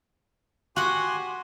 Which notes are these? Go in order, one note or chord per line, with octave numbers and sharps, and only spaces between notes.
F#4 G4 F#5 G#5 C6